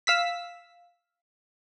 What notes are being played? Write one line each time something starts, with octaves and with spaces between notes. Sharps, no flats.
F5 E6 B6